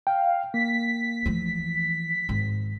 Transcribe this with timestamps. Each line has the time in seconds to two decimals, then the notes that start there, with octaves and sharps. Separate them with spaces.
0.07 F5 G5
0.54 A#3 B6
1.26 E3 F3 A3
2.29 G#1